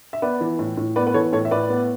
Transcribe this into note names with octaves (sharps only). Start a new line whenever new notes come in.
E5
B3 B4 D5
E3
A2
A2
B3 B4 D5
B4
E3 A4 C#5
A2 A4 C#5
E5
A2 B4 D5
B3